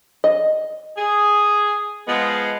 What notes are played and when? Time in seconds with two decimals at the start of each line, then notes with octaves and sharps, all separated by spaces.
0.24 D#5
0.97 G#4
2.07 F3 G#3 B3